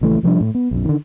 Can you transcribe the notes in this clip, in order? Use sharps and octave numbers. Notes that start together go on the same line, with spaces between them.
A#1 C#3 E3 A3
C3 F3 G3 D4
A2
B3
B1 F#2
D3 D#3